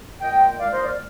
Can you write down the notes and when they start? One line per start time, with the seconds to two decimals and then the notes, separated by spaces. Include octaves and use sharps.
0.21 A#2 G#3 D#5 G5
0.59 A#2 G#3 D5 F5
0.71 C5 D#5
0.84 D5 F5